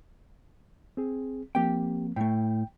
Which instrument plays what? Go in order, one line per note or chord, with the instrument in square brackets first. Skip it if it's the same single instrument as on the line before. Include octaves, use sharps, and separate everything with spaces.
[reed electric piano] C4 G#4
[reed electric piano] F3 A#3 C4 [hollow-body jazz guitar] G4 G5
[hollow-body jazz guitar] A2 A3 [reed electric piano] G5